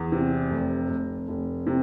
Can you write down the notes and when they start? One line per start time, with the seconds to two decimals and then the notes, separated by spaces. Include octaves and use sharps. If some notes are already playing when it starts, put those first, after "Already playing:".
Already playing: E2
0.12 C3
0.50 F1
0.89 F1
1.28 F1
1.67 C3